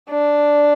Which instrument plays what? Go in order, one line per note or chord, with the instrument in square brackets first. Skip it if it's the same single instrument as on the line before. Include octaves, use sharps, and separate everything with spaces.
[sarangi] D4